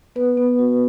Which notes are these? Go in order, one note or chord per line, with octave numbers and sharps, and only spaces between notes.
B3 B4
B3
F#4